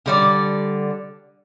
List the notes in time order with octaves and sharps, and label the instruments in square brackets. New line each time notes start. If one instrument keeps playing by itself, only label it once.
[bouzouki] D3 G3 D5